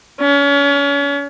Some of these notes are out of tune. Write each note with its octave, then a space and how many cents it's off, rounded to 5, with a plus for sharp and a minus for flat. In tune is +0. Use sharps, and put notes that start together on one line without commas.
C#4 +35